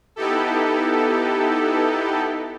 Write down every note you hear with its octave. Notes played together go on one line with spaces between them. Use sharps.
B3 D#4 E4 G4 A4